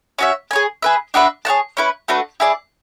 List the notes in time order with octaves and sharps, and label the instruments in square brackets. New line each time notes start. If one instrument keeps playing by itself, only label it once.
[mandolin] C#4 F#4 C#5 E5
G#4 C#5 G#5
G#4 B4 E5
D4 F#4 B4 E5
G#4 C#5 F#5 A5
C#4 E4 B4
A3 D4 F#4 B4
E4 G#4 D5